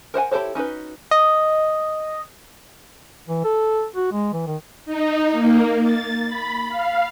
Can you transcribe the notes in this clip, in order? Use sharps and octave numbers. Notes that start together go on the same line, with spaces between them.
A#4 C5 F#5 G#5
E4 G4 A4 C5 C#5
C#4 D#4 F#4 B4
D#5
E3
A4
F#4
G#3
E3
D#3
D#4
A#3
A6
B5
F5